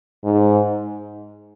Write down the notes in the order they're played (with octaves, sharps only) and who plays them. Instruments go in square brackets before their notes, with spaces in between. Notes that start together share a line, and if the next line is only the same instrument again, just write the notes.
[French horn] G#2